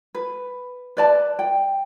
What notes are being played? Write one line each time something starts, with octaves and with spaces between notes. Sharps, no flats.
B4
B4 D5 A5
G5